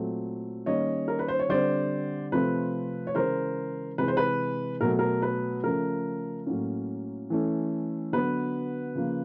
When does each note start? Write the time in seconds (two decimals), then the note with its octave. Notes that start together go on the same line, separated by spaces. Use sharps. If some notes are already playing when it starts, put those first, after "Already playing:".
Already playing: A#2 F#3 A3 C4
0.66 D#3 G3 A#3 C#4 C#5 D#5
1.08 A#4
1.19 B4
1.28 C5
1.39 C#5
1.49 D3 G3 C4 C5 D5
2.32 C3 F3 A3 C4 B4
3.07 C#5
3.15 C#3 E3 G#3 A#4 C5
3.98 C3 E3 G#3 B4
4.08 C5
4.17 B4
4.81 B2 F#3 A3 A#4
4.99 A#4
5.22 B4
5.64 C#3 F3 A3 C#4 A#4
6.46 A2 F#3 A#3 C#4
7.30 E3 A3 C#4
8.12 D3 F#3 B3 B4
8.95 C#3 F3 A#3